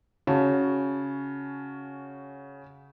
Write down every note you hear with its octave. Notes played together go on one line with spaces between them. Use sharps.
C#3 C#4 F#4 A5